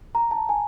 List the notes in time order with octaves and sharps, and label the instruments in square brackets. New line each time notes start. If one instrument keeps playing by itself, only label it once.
[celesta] A#5
A5
G#5